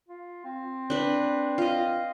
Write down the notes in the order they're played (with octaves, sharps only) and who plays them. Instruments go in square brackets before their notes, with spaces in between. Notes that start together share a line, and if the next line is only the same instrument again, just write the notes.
[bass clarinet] F4
C4
[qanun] D4 B4
F4 D#5